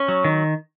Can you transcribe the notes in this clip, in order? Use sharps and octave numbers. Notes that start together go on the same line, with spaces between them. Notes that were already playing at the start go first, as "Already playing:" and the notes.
Already playing: C#4
F#3
D#3